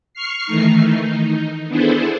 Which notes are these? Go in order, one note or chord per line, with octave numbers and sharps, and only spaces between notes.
C#6 F6 C7
D#3 E3 A3 D#4
D#4
B3 D4 E4 G#4 A4 C5